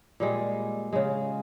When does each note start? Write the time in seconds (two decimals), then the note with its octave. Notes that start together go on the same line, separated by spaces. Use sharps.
0.20 A#2 G3 G#3
0.93 C#3 G#3